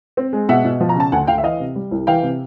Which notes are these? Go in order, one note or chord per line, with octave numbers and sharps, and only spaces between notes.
C4
G#3
B2 E5 F#5
B2
F3
A#5
C#3 A5
D2 F#5 G#5
D2 F5 G5
E5
E3 D#5 F5
C3
G3
C2
E3 F5 G5
C3